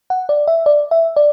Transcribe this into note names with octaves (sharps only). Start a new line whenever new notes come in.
F#5
D5
E5
D5
E5
D5